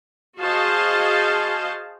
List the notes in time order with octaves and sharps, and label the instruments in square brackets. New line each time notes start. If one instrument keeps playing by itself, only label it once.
[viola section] F#4 G#4 C5 D#5 F5 A5